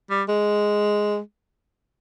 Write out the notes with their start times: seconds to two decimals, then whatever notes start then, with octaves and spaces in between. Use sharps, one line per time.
0.10 G3
0.28 G#3